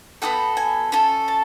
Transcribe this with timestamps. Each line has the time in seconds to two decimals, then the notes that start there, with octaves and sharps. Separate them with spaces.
0.22 B3 D#4 F#4 A4 G5
0.57 G#5
0.92 C#4 F4 A4
1.28 A5